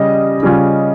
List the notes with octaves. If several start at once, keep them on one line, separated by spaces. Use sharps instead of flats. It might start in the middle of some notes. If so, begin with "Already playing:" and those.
Already playing: C#3 G3 C#4 D#5
C#3 G3 C#4 F4